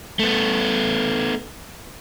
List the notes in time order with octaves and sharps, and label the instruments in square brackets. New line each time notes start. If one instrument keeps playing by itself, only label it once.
[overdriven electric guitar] A3 B3